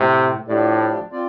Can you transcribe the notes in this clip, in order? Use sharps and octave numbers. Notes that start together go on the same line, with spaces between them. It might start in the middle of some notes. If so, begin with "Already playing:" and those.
Already playing: A2 C3 A3 C4
A2 F3 D4 G4 D5
C4 F4 D5